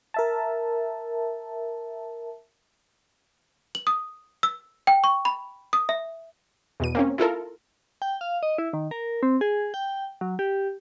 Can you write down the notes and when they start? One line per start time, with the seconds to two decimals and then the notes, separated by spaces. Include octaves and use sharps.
0.14 A#4 E5 A5
3.75 F#7
3.87 D#6
4.43 E6
4.87 G5
5.04 C#6
5.25 B5
5.73 D#6
5.89 E5
6.80 E2 B2 D#7
6.95 A#3 C4 C#4
7.18 E4 F4 A4 A#4
8.02 G5
8.21 F5
8.43 D#5
8.58 E4
8.73 D#3
8.91 A#4
9.23 C4
9.41 G#4
9.74 G5
10.21 F#3
10.39 G4